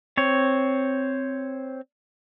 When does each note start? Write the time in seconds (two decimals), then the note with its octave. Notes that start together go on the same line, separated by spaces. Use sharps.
0.17 C4 C#5